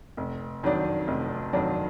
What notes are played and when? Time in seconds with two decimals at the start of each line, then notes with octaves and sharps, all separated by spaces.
0.17 F1
0.63 F2 D#3 F#3 D4
1.08 F1
1.53 F2 D#3 F#3 D4